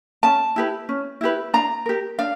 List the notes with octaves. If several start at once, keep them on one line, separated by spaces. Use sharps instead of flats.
C#4 A5
E4 G4 B4
C#4
E4 G4 B4
D4 A#5
G4 A#4
D4 F5